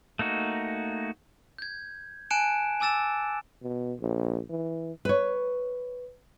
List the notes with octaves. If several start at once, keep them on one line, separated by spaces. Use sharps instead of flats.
A3 A#3 D#4 F#4
G6 G#6
G#5 A5 F#6 C#7 D7 E7
G#5 D6 E6 A6 E7
B2
A#1
E3
B4 C#5